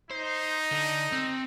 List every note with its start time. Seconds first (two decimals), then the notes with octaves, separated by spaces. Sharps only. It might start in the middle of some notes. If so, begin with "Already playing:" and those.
0.10 D#4 C5
0.72 D3
1.12 C4